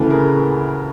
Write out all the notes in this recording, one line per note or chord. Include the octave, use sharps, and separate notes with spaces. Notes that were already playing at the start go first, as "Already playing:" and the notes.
Already playing: D2 C#3 E3 A4 B4
G#4 A#4